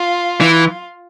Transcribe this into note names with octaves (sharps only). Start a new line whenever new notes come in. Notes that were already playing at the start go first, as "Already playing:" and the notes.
Already playing: F4
E3